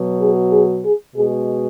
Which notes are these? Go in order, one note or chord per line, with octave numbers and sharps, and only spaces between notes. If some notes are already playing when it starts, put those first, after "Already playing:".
Already playing: B2 F#3
G#4
G#4
G#4
B2 G#3 G#4